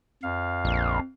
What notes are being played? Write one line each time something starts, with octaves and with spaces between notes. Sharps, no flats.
F2 F5
A#1